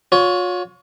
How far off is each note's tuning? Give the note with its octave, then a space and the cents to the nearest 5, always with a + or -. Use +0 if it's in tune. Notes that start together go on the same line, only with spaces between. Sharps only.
F4 +45 C#5 +25